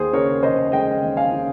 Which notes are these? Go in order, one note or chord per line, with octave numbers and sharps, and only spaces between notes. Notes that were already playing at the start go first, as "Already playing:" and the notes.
Already playing: D#2 G#4 C5
C#3 A#4 C#5
F1 C5 D#5
G#3 D#5 G5
D#2
F5 G#5
C#3